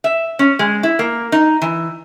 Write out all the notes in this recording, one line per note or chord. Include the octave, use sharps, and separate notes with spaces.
E5
C#4
G#3
E4
A#3
D#4
E3